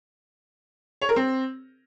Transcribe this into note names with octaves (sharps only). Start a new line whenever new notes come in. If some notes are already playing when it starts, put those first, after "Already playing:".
C#5
A#4
C4